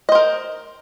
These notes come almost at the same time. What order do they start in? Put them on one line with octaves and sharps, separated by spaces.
D#5 C5 A#4